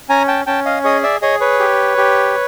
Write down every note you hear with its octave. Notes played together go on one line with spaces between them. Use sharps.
C#4 G#5 A#5
G5 A5
C#4 G5 A5
D#5 F5
G#4 C#5 D#5
D5 E5
G#4 C#5 D#5
B4 C#5
G4
G4